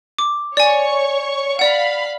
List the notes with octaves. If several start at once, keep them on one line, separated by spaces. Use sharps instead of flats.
D6
C#5 D5 G#5 C#6
D5 F5 F#5 B5